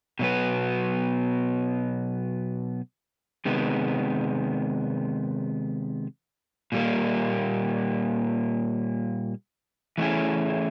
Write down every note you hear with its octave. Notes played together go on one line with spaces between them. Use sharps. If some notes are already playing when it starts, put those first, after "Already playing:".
B2 F#3 B3
C3 D#3 G#3 B3
A#2 G3 A#3
E3 A3 C#4 E4 G#4